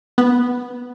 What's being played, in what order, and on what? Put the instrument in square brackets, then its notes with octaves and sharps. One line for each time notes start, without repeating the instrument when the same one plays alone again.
[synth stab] B3